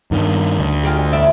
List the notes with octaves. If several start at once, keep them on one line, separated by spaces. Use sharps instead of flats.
G2 D#3
D2
F4 G4 G#4
D4
E2 D5 E5